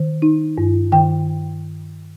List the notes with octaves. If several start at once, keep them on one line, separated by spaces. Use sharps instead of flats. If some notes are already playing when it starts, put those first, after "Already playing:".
Already playing: D#3
D#4
G2
D#3 G5